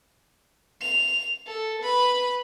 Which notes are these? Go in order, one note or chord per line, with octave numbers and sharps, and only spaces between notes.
F7
A4
B4 B5